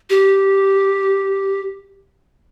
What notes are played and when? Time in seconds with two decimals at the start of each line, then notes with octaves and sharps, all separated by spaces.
0.10 G4